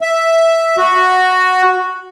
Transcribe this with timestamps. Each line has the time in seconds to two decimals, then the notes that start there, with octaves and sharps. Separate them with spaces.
0.01 E5
0.78 F#4